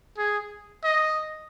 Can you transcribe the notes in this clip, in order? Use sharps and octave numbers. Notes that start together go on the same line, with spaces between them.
G#4
D#5